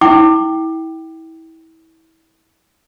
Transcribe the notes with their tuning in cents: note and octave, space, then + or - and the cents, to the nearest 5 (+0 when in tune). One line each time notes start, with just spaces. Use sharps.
E4 -30 G5 -10 D6 +25